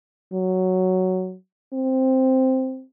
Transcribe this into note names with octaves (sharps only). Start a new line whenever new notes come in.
F#3
C4